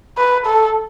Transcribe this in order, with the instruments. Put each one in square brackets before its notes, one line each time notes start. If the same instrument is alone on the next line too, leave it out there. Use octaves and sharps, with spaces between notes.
[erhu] B4
A4